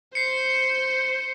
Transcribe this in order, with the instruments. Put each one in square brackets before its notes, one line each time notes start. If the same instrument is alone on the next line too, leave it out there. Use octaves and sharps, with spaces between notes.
[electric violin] C5 [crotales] C7 C#7